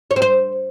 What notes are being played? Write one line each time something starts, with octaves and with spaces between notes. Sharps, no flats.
C#5
C4
C5